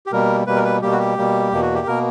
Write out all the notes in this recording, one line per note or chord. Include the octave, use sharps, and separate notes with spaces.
G4
B2 G3 A#3 A#4
B2 G3 A#3 B4
A#4
B4
B2 G3 A#3 G4
F#4
G4
B2 G3 A#3
E2 B2 A#3
F#4
G4
B2 A#3 A#4